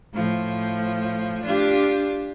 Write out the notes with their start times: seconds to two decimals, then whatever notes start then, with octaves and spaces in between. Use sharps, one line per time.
0.13 A2 F3
1.44 D4 F4 G4